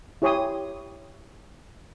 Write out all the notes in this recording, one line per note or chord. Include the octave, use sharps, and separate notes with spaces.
E4 G4 C#5 G#5 C6 D#6